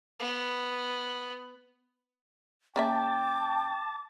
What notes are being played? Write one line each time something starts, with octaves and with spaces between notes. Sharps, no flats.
B3
C#3 A#3 E5 G5 A5 D6